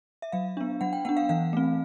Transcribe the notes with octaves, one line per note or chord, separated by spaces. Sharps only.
E5
F#3 F5
B3 D4
F#3 F#5
G5
B3 D4 F#5
F5
E3 F5
A3 C4